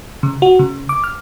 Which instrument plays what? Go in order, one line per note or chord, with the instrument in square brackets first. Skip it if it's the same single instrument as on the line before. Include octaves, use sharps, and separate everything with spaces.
[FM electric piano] C#3
F#4
C#3
D6
F6